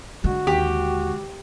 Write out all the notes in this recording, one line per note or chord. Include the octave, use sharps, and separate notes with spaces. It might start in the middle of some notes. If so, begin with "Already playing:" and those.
D3 G#3 F#4
D#2 G4